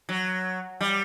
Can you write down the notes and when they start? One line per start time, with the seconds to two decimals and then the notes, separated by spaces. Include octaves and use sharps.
0.09 F#3
0.81 G3